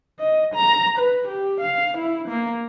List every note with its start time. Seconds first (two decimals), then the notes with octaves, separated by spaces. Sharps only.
0.19 D#5
0.54 A#5
0.98 B4
1.28 G4
1.61 F5
1.98 E4
2.28 A#3